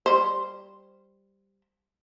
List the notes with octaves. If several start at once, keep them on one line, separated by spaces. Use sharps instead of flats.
G3 C5